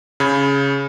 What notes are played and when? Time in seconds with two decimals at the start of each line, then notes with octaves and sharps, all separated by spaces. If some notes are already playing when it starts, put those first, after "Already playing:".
0.20 C#3 B5 G#6